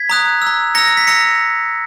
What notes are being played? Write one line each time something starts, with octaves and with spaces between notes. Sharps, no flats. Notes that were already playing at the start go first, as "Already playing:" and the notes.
Already playing: G#6 B6
A#5 D#6 F#6
A#5 E6
A#5 E6 A#6 C#7
A#6
B6
A#5 E6 A#6 C#7